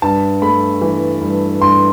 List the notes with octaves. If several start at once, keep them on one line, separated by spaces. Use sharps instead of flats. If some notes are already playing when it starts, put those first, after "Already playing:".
G2 A5
A3 B5
E3
G2
G2 C6